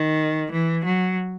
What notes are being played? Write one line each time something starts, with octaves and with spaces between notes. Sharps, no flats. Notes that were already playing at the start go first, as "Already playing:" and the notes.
Already playing: D#3
E3
F#3